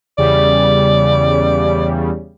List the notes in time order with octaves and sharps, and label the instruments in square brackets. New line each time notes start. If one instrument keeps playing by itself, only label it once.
[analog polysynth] E2 C#3 G3 [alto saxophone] D5